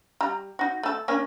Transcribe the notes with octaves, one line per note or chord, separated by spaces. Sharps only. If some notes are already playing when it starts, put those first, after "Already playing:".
G3 A#5
D#4 F#4
A3 A4
A#3 C#4 D4